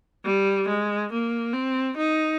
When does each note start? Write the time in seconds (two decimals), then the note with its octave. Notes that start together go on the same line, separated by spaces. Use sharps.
0.25 G3
0.68 G#3
1.12 A#3
1.53 C4
1.97 D#4